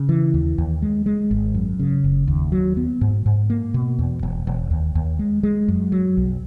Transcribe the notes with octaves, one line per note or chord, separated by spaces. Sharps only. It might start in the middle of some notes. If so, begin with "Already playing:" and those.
Already playing: C#3
E3
D#2
D#2
G#3
G#3
G#1
F#2
C#3
F#1
D#2
F#3
B3
G#2
G#2
A#3
B2
E2
E1
E1
D#2
D#2
G#3
G#3
F#2
F#3
B1